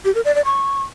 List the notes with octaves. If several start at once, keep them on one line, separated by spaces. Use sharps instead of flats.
G4
A#4
D5
D5
C#6